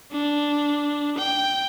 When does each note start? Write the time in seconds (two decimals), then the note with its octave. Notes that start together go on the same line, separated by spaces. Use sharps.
0.12 D4
1.18 G5